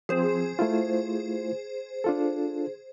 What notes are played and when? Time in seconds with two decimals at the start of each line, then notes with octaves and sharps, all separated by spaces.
0.09 F3 C4 G#4 C5
0.59 A3 E4 F4
2.04 D4 F4 A4